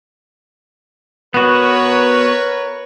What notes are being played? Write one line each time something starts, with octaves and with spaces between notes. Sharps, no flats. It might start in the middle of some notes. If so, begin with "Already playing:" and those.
B3 F#4 A#4 B4 C#5